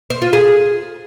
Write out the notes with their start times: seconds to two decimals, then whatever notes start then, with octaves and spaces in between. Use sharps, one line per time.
0.10 C5
0.22 F4
0.33 G#4